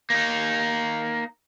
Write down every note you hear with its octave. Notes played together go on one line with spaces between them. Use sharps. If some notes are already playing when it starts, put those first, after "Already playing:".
A#3 D#4